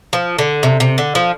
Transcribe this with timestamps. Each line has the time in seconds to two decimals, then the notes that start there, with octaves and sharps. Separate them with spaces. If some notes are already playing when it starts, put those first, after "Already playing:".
0.13 F3
0.38 D3
0.63 C3
0.80 C3
0.98 D3
1.15 F3